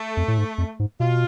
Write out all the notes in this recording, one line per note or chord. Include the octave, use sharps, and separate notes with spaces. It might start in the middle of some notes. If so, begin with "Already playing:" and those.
Already playing: A3
F2
A2
G#2
F2
G#2
B2 F4